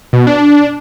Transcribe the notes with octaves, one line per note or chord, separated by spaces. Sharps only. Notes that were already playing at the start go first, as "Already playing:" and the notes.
B2
D4